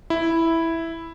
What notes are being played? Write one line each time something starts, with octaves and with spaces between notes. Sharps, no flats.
E4